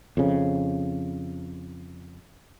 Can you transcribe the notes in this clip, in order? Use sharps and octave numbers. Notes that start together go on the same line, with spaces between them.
F2 C#3